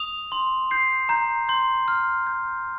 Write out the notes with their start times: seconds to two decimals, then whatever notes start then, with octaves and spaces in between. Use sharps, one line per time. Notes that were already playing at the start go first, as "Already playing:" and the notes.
Already playing: D#6 F7
0.32 C6
0.71 G6 C7
1.09 A#5 G6
1.49 C6 G6
1.88 F6
2.27 G6